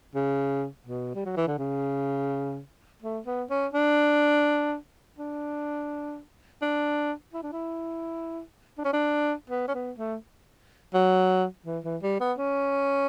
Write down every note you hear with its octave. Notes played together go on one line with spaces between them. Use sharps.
C#3
B2
G3
F#3
E3
D3
C#3
A3
B3
C#4
D4
D4
D4
E4
D4
E4
D4
C#4
D4
B3
C#4
B3
A3
F#3
E3
E3
G3
B3
C#4